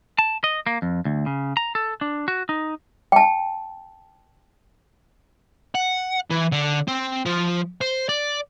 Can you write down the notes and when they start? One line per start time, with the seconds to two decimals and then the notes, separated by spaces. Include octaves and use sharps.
0.19 A5
0.44 D#5
0.67 A#3
0.82 F2
1.05 D2
1.26 C#3
1.57 A#5
1.75 A4
2.01 D4
2.28 F#4
2.49 D#4
3.12 G5 A5
5.75 F#5
6.30 E3
6.52 D3
6.88 C4
7.26 F3
7.81 C5
8.09 D5